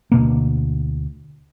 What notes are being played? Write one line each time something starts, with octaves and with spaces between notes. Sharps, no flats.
D2 B2 A#3